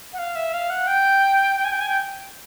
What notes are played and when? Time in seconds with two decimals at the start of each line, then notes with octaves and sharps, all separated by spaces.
0.13 F#5
0.19 F5
0.36 E5
0.53 F5
0.70 F#5
0.87 G5
1.56 G5
1.65 G#5
1.72 G5
1.80 G#5
1.89 G5